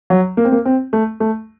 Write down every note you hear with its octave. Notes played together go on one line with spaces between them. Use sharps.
F#3
A#3
C4
A#3
C4
A3
A3